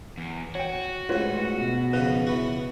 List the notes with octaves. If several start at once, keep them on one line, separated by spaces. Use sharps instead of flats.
E2
F#4 C#5 G5
A1 G#2 F4 B4 C#5
B2
F2 C#3 D#4 B4
E3 B3 F#4